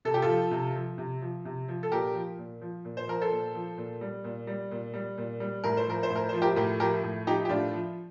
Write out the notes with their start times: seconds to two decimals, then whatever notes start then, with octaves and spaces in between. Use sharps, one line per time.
0.05 C3 A4
0.14 G4
0.22 F4 A4
0.29 F3
0.51 C3
0.75 F3
0.98 C3
1.22 F3
1.45 C3
1.68 F3
1.83 A4
1.91 A#2 G4 A#4
2.14 F3
2.38 A#2
2.61 F3
2.85 A#2
2.97 C5
3.07 F3 A#4
3.21 A4 C5
3.32 A#2
3.55 F3
3.77 A#2
4.01 G3
4.24 A#2
4.47 G3
4.71 A#2
4.94 G3
5.18 A#2
5.40 G3
5.64 A2 A#4
5.77 C5
5.87 F3 A#4
6.03 C5
6.10 A2
6.16 A#4
6.29 F3 C5
6.42 G4 A#4
6.56 A2 G4 A#4
6.80 F3 G4 A#4
7.04 A2
7.27 F3 D#4 G4
7.45 G4
7.49 A2 D4 F4
7.73 F3